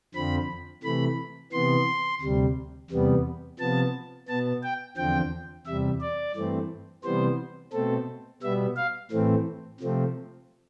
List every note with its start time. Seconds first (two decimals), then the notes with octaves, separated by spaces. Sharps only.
0.14 F2 D3 F3 C4 B5
0.83 C3 E3 A3 B5
1.52 C3 E3 B3 C6
2.21 D2 C3 G3
2.90 E2 C3 G3 B3
3.59 C3 F3 B3 A5
4.28 B2 B3 A5
4.63 G5
4.97 E2 D3 F3 C4 G5
5.66 E2 C3 G3 E5
6.01 D5
6.35 G2 E3 A3 C4
7.04 C3 E3 G3 B3 C5
7.73 B2 A3 C4 A4
8.42 B2 G3 B3 E5
8.77 F5
9.11 A2 E3 A3 C4
9.80 C3 F3 A3 C4